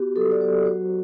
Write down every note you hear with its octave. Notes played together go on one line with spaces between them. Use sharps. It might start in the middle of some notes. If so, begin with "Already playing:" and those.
Already playing: B3 F#4 G4
F#3 A4
D5
F#3 C5
F#4 C5